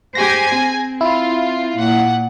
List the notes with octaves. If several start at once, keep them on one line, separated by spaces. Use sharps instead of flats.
G4 G#4 C5 G#5 A#6
C4
E4 F4
A#2 F#5